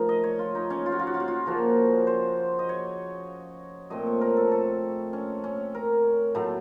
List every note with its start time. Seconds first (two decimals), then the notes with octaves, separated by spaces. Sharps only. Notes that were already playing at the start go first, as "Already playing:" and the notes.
Already playing: C#3 F3 A3 D#4 A#4
0.09 D#5
0.24 C#5
0.39 F4
0.55 D#4
0.70 C#4
0.86 F4
0.92 F#4
0.99 F4
1.07 F#4
1.14 F4
1.20 F#4
1.28 F4
1.46 C#3 F3 A#3 F#4
2.07 C5
2.59 D#5
2.69 C#5
3.90 A#2 A3 C4 D#5
4.07 C#5
4.21 A#4
4.37 A4
4.52 A4
5.13 C#4
5.44 C#4
5.75 A#4
6.35 A2 F#3 A3